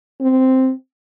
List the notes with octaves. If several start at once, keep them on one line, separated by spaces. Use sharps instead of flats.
C4